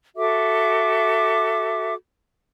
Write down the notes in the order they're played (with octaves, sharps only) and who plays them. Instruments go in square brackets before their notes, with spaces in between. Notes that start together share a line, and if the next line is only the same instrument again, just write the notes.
[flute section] F#4 A4 E5 D6